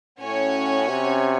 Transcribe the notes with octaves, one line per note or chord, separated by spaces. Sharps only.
A2 C#4 F#4 C#5 G#5
C3